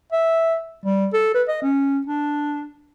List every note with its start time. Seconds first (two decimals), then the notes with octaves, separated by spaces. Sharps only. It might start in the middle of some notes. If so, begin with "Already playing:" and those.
0.12 E5
0.84 G3
1.13 A4
1.34 B4
1.48 D#5
1.62 C#4
2.06 D4